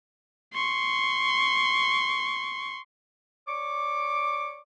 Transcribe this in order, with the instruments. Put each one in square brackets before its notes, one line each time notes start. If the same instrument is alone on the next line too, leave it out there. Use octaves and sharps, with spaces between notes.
[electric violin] C6 C#6
[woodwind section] C#5 D5 C#6 D6